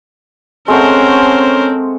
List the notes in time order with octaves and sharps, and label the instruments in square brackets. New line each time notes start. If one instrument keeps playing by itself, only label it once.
[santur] G#3 A3 F#5 [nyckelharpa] C4 [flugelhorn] C#4 [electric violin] A#4 C5